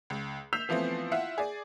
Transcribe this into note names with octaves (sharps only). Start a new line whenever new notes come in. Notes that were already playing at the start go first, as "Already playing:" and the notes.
C#2
E6 G6 B6 C7 F7
E3 F3 A3 B3 C4
E4 F4 E5 F#5
G#4 D5